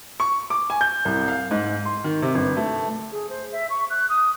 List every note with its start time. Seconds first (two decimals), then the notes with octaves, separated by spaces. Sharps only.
0.20 C#6
0.50 D6
0.70 G#5
0.81 G6
1.05 C2
1.28 F5
1.51 G#2
1.85 C6
2.04 D#3
2.22 C3
2.35 G1
2.57 A3
3.12 G#4
3.30 C5
3.52 E5
3.70 C#6
3.90 F#6
4.10 D#6